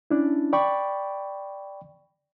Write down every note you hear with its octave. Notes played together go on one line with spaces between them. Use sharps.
C#4 D4 E4
D5 G5 B5 C#6